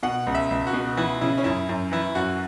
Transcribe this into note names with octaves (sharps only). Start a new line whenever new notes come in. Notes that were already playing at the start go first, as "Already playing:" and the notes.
B2 F#5
C#2
E5
C#2
F#4
B2
E3 E4
C#3 E4
C#4
F#2 E4
F#2
E3 E4
F#2 F#4